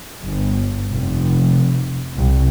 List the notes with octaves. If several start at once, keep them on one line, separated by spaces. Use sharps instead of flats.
G1
F1
C2